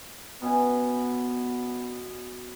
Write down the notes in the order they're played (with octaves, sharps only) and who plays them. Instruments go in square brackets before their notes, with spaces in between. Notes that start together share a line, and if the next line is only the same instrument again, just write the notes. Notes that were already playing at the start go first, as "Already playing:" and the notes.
[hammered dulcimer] B2 C#4 G#5 [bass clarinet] B3